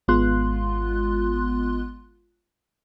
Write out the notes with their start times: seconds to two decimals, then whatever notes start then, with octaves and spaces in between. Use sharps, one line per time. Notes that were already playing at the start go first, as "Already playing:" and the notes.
0.08 G#1 G#3 B3 F4 C6 F#6